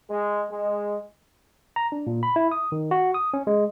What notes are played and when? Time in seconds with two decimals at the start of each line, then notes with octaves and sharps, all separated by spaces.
0.10 G#3
0.50 G#3
1.76 A#5
1.92 D4
2.07 A#2
2.23 B5
2.36 E4
2.52 D#6
2.72 D#3
2.91 F#4
3.14 D#6
3.34 C#4
3.47 G#3